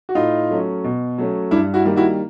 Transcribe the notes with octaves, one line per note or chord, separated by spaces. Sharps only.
F#4
A2 D#4 F4
F#3 A3 C#4
B2
F#3 A3 C#4
G2 D4 E4
E4 F#4
D#3 G3 A#3
E4 F#4